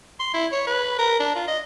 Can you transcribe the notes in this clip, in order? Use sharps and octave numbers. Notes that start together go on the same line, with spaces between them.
C6
E4
C#5
B4
A#4
D4
F4
D#5